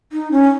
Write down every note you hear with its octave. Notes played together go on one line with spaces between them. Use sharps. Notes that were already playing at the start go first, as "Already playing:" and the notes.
D#4
C#4